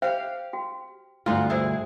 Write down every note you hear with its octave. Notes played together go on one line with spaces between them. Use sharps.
G4 C5 E5 F5 G5
F#4 G5
D2 G2 B3 C4 E4 F4 C6
B2 E4 G#4 C5 E5